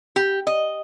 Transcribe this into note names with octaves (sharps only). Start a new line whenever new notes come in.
G4
D#5